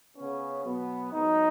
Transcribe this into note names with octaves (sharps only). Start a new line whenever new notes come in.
C#3 B3 C#4
B2 F#3 B3
G#2 F#3 B3 D#4